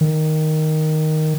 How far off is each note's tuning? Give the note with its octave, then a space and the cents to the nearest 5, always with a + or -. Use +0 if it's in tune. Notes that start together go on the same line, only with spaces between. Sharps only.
D#3 +0